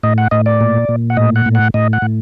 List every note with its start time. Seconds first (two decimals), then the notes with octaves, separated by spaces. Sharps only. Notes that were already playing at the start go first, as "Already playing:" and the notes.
0.03 A2 D#5
0.18 F#5
0.31 A2 D#5
0.46 D5
0.61 A#2
0.89 A#2
1.10 F#5
1.17 A2 D#5
1.36 F#5
1.46 A2
1.55 F#5
1.74 A2 D#5
1.93 F#5
2.02 A2